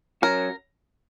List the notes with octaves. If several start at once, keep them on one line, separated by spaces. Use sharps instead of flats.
F#3 C#4 F#4 A#4